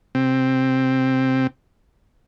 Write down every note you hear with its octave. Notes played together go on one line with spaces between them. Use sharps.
C3 C4